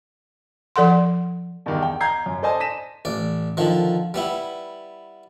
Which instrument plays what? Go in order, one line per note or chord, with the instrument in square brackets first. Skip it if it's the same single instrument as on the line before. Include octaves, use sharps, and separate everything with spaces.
[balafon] F3 A4 F#5 C6
[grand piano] E2 G2 D#3
G5
A#5 G6 G#6 C7
F#2
A4 C5 D5 D#5 G#5 A5
A#6 B6 D#7 E7
[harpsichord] A1 D5
D3 D#3 F3
G3 B3 E4